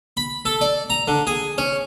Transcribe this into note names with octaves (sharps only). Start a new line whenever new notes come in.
B5
A4
D5
A#5
D3
G#4
C#4